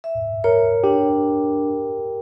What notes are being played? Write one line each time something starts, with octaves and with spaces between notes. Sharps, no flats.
E5
A#4 C#5
D4 G4